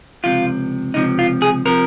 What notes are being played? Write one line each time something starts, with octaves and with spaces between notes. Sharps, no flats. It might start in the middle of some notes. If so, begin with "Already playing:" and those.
C#2 C3 F3 F4
C#2 C3 F3 D#4
F4
G#4
C3 F3 A#4